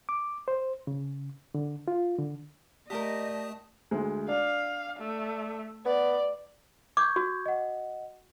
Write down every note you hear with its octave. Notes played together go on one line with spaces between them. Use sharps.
D6
C5
C#3
D3
F4
D3
A3 G4 A#4 D5 D#5 A5 D#6
D2 G#3
D4 F5
A3
B3 D5
C#6 D6 G6 G#6
F#4
D#5 F#5